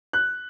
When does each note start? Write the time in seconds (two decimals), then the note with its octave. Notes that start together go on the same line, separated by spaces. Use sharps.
0.13 F#6